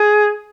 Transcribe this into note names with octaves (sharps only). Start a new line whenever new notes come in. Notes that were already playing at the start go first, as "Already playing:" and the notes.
Already playing: G#4